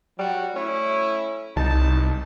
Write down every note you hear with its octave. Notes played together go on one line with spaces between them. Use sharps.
F#3 G3 F#4
A3 C#4 E4
C2 D#4 A5